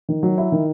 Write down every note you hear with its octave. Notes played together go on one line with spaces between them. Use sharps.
D#3
F#3
E4
D#3